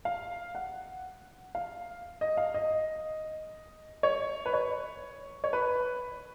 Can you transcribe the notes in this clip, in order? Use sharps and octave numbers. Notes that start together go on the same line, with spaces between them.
F5
F#5
F5
D#5
F5
D#5
C#5
B4
C#5
C#5
B4